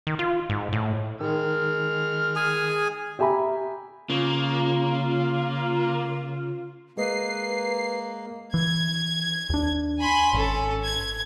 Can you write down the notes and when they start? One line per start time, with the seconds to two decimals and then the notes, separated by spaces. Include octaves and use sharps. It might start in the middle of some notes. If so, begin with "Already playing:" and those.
0.07 D#3
0.19 F4
0.49 G#2
0.73 A2
1.21 D#3 G#3 F6
2.36 G#4 G#5
3.19 G4 E5 G#5 A#5 B5
4.10 C#3 A#3 F4
6.97 G#3 A#3 B4 D#5 C7
8.54 E3 G#6
9.50 D#2 D4
9.99 G#5 B5 C6
10.33 G#1 C#4 A4
10.85 G#6